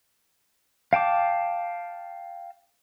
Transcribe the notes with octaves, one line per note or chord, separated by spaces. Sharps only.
F5 G5 A5 D6